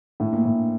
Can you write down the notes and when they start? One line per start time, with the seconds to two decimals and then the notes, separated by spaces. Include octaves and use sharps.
0.20 A2
0.32 A#2
0.45 A2